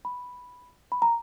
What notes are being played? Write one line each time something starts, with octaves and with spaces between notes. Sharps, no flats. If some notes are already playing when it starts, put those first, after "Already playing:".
B5
B5
A#5